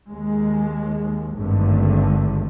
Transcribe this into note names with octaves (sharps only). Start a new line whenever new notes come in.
D#2 G#3
G#1 G2 D3 D#3 A3